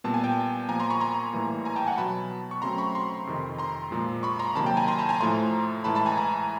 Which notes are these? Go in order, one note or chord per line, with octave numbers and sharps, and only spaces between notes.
A#2 G3 B3 A5
G#5
G5 A5
A#2 F3 A#3 G#5 A#5
A#5 C6
B5 C#6
A#5 C6
A2 E3 G3 A#3
G#5 A#5
G5 A5
F#5 G#5
B2 F#3 B3 A5 B5
C#6
C#3 F#3 A3 C4 A#5 C6
B5 C#6
A#5 C6
F2 C3 D#3
A#5 C6
A#2 F3 G#3
B5 C#6
A#5 C6
C3 D#3 F#3 A#3 A5 B5
G5 A5
G#5 A#5
A#5 C6
A5 B5
G#5 A#5
A2 F3 A3 A#5 C6
A2 E3 G#3 A5 B5
A5 B5
G#5 A#5
G#5 A#5